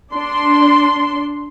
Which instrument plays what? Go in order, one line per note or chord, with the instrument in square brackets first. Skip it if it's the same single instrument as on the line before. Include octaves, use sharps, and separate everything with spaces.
[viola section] D4 C6